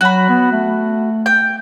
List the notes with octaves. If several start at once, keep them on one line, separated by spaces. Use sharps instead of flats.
F#3 F#4 B5
B3
A3
G5